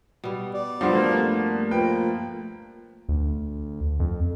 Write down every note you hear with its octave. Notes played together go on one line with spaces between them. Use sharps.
B2 G3
D5
G2 F3 B3 F#4 C5
A3 A#3
F3 B4 G5
D2
F2